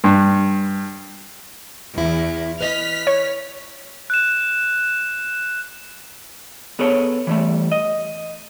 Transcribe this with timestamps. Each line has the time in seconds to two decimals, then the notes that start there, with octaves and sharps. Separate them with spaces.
0.04 G2
1.98 E2 E4
2.61 B4 D#5 F6 B6
3.07 C#5
4.10 F#6 E7
6.79 B3 G#4 A4 C#5
7.27 E3 G3 A3
7.72 D#5